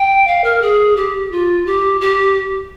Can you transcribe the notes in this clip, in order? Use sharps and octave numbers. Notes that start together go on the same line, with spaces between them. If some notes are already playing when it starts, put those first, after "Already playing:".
Already playing: G5
F5
A#4
G#4
G4
F4
G4
G4